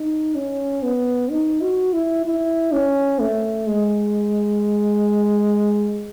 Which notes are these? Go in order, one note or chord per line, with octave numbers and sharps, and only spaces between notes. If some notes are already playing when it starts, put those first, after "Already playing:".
Already playing: D#4
C#4
B3
D#4
F#4
E4
E4
C#4
A3
G#3